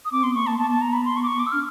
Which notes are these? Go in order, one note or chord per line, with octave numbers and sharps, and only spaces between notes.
D#6
C4 D6
B3 C6
A#3 C#6
A#3 A5
B3 A5
A5
A#5
B5
C6
C#6
D6
C#6
D6
E6
D4 F6